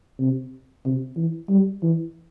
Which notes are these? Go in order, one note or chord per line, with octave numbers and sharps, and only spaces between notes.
C3
C3
E3
G3
E3